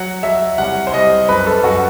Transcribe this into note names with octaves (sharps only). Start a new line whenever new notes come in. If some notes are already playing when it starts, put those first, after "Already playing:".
Already playing: F#3 F#5
F#3 E5
C2 F#5
C5
C2 D#5
F#2 B4
A4
F#2 F#4